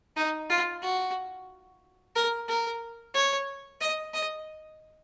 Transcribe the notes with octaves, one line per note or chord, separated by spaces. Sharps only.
D#4
F4
F#4
A#4
A#4
C#5
D#5
D#5